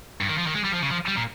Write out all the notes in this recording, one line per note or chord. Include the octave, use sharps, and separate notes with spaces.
G2
D#3
F3
D#3
G#3
G3
F3
C#3
F3
G3
A#2